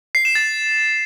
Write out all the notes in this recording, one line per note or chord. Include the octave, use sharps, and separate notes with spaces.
C7
E7
A6